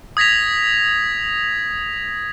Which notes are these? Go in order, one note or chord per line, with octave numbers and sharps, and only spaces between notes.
D#6 G#6 A#6 B6 F7